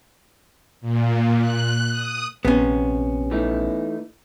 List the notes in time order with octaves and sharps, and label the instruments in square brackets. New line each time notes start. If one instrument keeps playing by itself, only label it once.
[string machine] A#2
F#6
D#6
[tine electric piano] A#1 [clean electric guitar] C3 [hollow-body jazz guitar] B3 C#4
[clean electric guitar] E3 A3 D#4